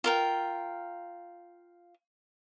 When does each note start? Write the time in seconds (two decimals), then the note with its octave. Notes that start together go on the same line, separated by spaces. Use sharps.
0.04 F4 A#4 G5